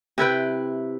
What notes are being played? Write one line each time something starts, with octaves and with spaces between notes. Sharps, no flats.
C3 E4 B4 G5